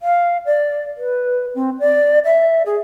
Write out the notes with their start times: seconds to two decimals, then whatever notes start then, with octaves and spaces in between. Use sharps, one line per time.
0.01 F5
0.46 D5
0.97 B4
1.55 C4
1.80 D5
2.25 E5
2.66 G#4